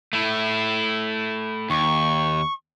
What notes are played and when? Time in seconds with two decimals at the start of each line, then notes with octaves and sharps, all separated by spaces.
0.13 A3 E4
1.70 D#2 C#6